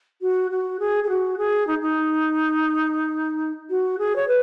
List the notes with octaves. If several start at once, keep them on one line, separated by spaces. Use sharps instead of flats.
F#4
F#4
G#4
G#4
F#4
G#4
D#4
D#4
F#4
G#4
C#5
B4